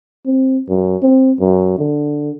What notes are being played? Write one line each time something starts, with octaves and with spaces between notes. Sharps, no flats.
C4
F#2
C4
F#2
D3